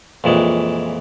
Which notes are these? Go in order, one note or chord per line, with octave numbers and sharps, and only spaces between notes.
F2 A#2 E3 G#3 C#5